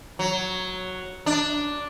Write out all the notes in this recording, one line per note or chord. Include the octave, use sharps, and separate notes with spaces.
F#3
D4